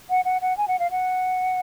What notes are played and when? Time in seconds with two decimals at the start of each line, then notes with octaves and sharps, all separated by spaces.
0.10 F#5
0.25 F#5
0.42 F#5
0.58 G#5
0.68 F#5
0.79 F5
0.91 F#5